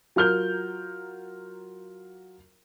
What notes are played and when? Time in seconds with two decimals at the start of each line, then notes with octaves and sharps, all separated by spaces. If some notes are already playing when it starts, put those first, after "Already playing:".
0.16 F#3 F4 A#4 F6 G6 G7